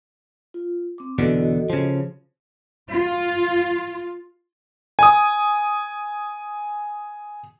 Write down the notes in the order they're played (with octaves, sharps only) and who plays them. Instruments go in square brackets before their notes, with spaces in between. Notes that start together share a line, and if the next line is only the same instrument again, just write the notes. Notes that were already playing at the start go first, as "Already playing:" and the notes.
[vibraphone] F4
C4 D6
[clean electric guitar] E2 B2 D3 [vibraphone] F#4 A4 D#5
[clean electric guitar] C#3 F3
[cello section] F4
[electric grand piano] G#5 D#6